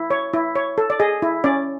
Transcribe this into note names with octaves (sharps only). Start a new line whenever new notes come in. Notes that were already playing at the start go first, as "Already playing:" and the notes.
Already playing: E4
C#5
E4
C#5
A4
D5
G#4 D#5
E4
C#4 D5